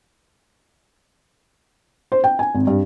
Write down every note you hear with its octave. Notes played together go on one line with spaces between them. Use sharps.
C5
G5
G#5
G#1
G2